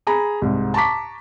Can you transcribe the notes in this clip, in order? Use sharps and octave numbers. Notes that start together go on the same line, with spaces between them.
G#4 A#5 B5
C2 G#2
A5 A#5 C#6 D6 B6